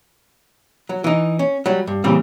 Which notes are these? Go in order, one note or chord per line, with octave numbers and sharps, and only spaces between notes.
F#3
E3 D#4
C#4
F#3 G3
G2
A#2 C#3 E3 G3 C4